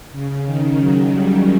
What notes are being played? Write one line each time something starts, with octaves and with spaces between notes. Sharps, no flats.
C#3
D#3
F#3
G3